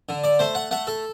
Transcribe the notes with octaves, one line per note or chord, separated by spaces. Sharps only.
D3
D5
A3 C5
F#5
A3 F#5
A4